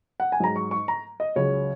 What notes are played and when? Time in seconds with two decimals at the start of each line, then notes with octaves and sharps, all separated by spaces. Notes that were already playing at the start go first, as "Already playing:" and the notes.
0.20 F#5
0.32 G#5
0.40 G#2 F#3 A#5
0.56 C#6
0.71 C#6
0.88 A#5
1.20 D#5
1.36 C#2 C#3 F#3 C#5